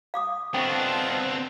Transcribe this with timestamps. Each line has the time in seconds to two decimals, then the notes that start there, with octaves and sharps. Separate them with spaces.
0.14 F5 D6 D#6
0.54 B3 C4 D4 F4 A4 D#5 G5 C#6